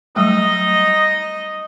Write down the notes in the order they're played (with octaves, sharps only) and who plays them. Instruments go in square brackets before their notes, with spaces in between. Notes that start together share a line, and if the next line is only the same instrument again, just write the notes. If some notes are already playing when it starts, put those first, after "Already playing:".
[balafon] F#3 G3 A3 [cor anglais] D#4 [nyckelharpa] D#5